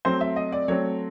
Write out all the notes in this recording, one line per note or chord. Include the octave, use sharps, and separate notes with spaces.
F#3 A3 C4 C5
E5
D#5
D5
F#3 A3 C4 C#5